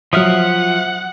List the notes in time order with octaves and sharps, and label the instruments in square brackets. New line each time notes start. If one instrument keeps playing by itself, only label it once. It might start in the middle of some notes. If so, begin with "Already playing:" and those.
[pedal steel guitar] F3 E5 F6 [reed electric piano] F#3 D#6 [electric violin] F#5